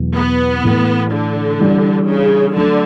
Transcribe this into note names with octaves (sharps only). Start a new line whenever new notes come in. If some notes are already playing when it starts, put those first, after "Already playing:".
Already playing: E2 B2 F#3
B3
A2 E3 A3
D3
E3 G3 D4
C#3
D3 F#3 A3 D4